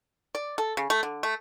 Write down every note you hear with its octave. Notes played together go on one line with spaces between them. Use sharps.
D5
A4
C#3
A3
D3
A3